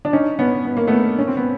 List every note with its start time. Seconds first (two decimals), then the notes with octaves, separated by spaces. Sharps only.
0.05 D4
0.13 C#4 D#4
0.39 B3 C#4
0.65 B3
0.77 A#3
0.87 A3 B3
1.19 C#4
1.28 C4
1.37 B3